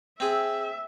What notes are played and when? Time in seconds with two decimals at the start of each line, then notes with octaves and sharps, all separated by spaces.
0.20 C4 G#4 E5